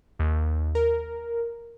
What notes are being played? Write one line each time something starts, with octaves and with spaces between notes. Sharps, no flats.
D#2
A#4